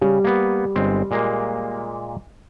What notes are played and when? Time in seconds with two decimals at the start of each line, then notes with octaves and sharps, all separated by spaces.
0.01 C#3 G3
0.24 A#3 B3
0.76 G1 G#3 C4
1.11 A#2 G#3 A#3